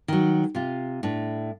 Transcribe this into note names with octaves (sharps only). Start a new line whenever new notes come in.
D#3 F#3
C3 F4
A2 D4